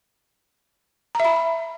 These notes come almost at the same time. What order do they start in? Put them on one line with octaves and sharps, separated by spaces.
A#5 E5 B5